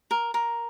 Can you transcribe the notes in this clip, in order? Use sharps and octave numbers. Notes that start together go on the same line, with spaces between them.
A#4
A#4